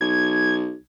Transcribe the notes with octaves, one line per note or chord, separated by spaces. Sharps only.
B1 G#6